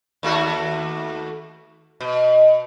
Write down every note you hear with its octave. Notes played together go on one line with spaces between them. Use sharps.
D#2 A3 F#4
B2